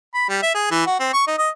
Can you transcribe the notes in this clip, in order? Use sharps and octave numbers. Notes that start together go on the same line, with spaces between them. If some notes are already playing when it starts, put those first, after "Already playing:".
B5
G3
E5
G#4
E3
F#4
C4
C#6
D#4
D#5